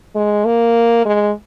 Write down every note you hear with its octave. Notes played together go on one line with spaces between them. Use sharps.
G#3
A#3
G#3